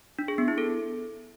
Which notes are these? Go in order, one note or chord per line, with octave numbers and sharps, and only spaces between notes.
D4
G#4
B3
E4
A4